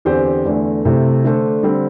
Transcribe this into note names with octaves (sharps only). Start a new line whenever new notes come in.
E2 D3 C4 G4 C5
E2 D3 A3
C3 A3 E4 C5
D3 A3 D4 A4 C5
D3 G3 C4